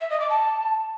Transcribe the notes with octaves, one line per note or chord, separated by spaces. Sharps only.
E5
D#5
D6
A5